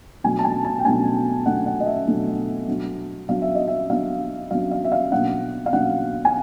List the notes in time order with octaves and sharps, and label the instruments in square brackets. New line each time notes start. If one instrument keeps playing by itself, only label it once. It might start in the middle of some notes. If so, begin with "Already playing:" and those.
[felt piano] B2 F#3 A3 D4 G#5
A5
G#5
A5
G5
B2 F#3 A3 D4 G#5
B2 F#3 A3 D4 F#5
F#5
D#5
E5
B2 F#3 A3 D4
F#3 B3 D4
F#3 B3 D4 F5
E5
D#5
E5
F#3 B3 D4 F5
F#3 B3 D4 F5
F5
E5
F5
B2 F#3 A#3 D4 F#5
F5
B2 F#3 A#3 D4 F#5
G#5